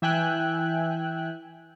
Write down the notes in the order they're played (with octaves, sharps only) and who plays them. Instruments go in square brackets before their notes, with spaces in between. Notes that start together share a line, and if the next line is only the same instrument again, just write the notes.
[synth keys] E3 E5 G5 G#5 F#6